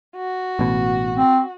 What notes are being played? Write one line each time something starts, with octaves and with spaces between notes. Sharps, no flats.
F#4
A1 B2
C4